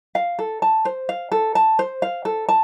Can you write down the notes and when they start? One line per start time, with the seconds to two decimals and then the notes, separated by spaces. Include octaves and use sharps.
0.15 F5
0.39 A4
0.62 A5
0.85 C5
1.09 F5
1.32 A4
1.55 A5
1.79 C5
2.02 F5
2.25 A4
2.49 A5